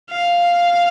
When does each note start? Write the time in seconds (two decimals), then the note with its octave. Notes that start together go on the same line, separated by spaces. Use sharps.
0.11 F5